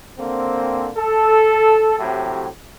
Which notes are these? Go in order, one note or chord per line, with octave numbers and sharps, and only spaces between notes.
D3 A#3 C4
A4
A2 C3 F#3 E4 G4